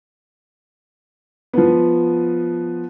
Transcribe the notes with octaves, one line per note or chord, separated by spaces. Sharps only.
F3 B3